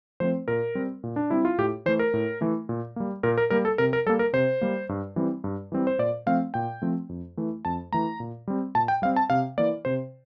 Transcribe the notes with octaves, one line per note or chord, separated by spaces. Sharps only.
F3 A3 C4 C5
A#2 A#4
G3 C4
A#2
D4
G3 C4 E4
F4
A2 G4
E3 A3 C5
A#4
A2
E3 A3
A#2
G3 A#3
A#2 A#4
A#4
G3 A#3 A#4
A4
C3 A#4
A#4
G3 A#3 A4
A#4
C3 C5
G3 A#3
G2
E3 G3 C4
G2
E3 G3 C4
C5
A#2 D5
F3 A3 C4 F5
A#2 G5
F3 A3 C4
F2
E3 A3
F2 A5
E3 A3 A#5
A#2
G3 C4
A#2 A5
G5
G3 C4 F5
A5
C3 F5
E3 A#3 D5
C3 C5